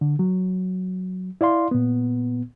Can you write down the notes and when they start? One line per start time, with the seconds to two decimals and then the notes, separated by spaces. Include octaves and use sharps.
0.01 D3
0.19 F#3
1.41 E4 D5 F5 C6
1.71 A#2 B3